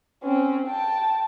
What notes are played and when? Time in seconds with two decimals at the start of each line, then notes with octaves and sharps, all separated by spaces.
0.23 C4 C#4
0.67 G5 A5